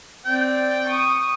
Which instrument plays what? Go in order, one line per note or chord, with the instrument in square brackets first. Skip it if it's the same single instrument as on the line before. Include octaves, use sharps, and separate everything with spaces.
[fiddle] C4 D5 [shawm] G5
[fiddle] C#6 D#6